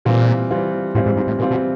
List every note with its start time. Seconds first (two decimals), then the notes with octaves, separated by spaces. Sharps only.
0.05 A#2 E3 G3 C4 F4
0.51 E3 G3 C4 F4
0.95 A2 E3 G3 C4 F4
1.06 G#2
1.17 G#2
1.27 A2
1.39 A#2 E3 G3 C4 F4
1.51 B2